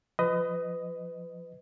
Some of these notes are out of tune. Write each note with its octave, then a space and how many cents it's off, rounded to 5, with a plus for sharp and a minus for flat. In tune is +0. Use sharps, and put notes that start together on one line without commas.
F3 +0 B4 +30 D#5 +0